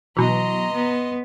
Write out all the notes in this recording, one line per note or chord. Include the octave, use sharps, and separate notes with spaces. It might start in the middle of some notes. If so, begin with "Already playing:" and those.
B2 E3 F#3 D#5 A#5 C6
B3